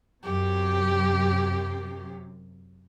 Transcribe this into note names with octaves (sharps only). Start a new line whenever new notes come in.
F#2 C3 G4